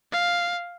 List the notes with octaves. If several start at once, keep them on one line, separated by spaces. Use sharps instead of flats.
F5